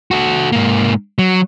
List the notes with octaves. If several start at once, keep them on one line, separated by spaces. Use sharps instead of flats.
F#4 A4
G#2 A#3
F#3